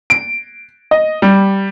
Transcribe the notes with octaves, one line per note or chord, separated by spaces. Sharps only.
D7
D#5
G3